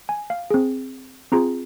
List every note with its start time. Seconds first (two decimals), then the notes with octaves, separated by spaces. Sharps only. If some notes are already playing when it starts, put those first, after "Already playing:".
0.09 G#5
0.30 F5
0.51 C4 G#4
1.32 C4 F4 G#4 A#5